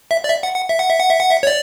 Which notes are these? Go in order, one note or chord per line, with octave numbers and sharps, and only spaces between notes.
E5
D5
E5
F#5
F#5
E5
F#5
E5
F#5
E5
F#5
E5
C#5
D5